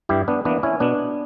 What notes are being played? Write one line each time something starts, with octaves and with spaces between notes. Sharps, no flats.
G2 E4 G4
B3 D4
E3 A#3 B3 D4
C#4 E4
B2 B3 D4